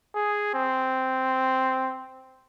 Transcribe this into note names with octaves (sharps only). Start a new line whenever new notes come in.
G#4
C4